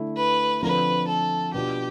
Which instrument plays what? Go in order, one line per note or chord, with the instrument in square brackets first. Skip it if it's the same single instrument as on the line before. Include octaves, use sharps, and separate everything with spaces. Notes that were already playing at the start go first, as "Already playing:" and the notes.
Already playing: [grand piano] D3 A3 E4
[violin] B4
[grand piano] D3 F3 C4 F4 [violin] B4
[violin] A4
[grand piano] B2 B3 D4 F4 [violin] G4